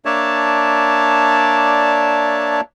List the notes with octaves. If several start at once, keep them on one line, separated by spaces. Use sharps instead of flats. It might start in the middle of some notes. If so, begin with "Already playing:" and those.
A#3 D4 C#5 D5 E5 A5